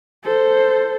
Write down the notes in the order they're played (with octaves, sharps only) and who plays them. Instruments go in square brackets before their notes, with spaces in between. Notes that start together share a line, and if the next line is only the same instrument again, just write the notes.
[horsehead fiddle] A4 C5